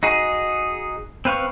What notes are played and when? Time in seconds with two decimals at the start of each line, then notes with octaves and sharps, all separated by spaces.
0.03 D#4 F#4 G#4
1.25 C4 B4 F5 C#6